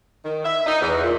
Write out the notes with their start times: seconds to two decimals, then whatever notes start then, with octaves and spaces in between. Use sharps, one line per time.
0.25 D#3
0.45 E5
0.67 D#4
0.82 E2
1.03 A#2